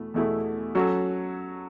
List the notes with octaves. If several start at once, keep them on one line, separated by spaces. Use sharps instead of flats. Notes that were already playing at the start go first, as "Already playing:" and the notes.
Already playing: E2 B2 A3 E4
E2 B2 A3 E4 G#4
F#3 C#4 F#4 A4